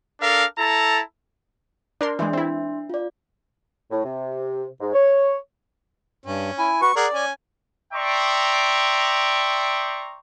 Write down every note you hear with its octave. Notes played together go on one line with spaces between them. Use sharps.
D4 A4 A#4 F5
E4 A4 A5 A#5
D4 A#4 D5 C6
E3 G#3 D4 E5 C6
C4 E4
F4 D5
A2
C3
G#2
C#5
G2 C#4
E4 G#5
F#4 B4 C#6
G#4 A#4 D5 F#5
C#4 G#5
D5 E5 G5 A#5 C6 C#6